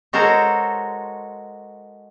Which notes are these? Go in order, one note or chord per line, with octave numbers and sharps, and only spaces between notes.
G#3 F#4 A4 A#4 C5 C#5